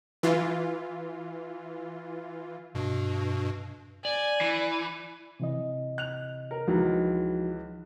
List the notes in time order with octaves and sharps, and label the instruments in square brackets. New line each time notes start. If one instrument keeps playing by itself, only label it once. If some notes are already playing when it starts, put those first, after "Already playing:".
[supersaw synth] E3 F4
[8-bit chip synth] G2 B2
[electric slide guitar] D5 [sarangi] G#5
[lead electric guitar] E3
[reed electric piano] C3 E3 D#5
[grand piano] F#6 F7
A#4
[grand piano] C#2 E3 [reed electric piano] F3 D#4 F#4